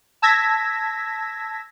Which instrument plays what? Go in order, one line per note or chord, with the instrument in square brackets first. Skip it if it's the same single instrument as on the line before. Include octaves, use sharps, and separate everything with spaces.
[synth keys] A5 E6 G#6 A#6 B6